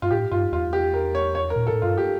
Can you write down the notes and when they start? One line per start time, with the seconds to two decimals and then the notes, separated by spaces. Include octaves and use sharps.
0.02 G2 F4
0.11 A2 G4
0.31 G2 F4
0.53 E2 F4
0.73 G4
0.94 A#4
1.15 C#5
1.35 C#5
1.50 A#4
1.56 A#2
1.67 A4
1.70 A2
1.82 G2 F4
1.98 G4